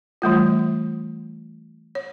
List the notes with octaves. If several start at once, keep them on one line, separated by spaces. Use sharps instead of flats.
E3 G3 A3 F4
C#5